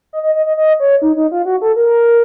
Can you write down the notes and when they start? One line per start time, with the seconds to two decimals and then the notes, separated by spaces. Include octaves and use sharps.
0.13 D#5
0.23 D#5
0.35 D#5
0.46 D#5
0.57 D#5
0.80 C#5
1.02 D#4
1.16 D#4
1.32 F4
1.45 F#4
1.62 A4
1.76 A#4